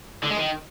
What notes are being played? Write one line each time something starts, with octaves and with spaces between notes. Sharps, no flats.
D3
G#3
D#3